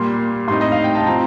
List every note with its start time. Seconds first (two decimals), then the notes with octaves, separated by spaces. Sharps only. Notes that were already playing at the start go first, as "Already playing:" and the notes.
Already playing: A#2 G3 A#3 C6
0.47 A2 G3 C4 D#4 C6
0.61 D#5
0.72 F5
0.84 G5
0.95 A5
1.06 F3 C4 A#5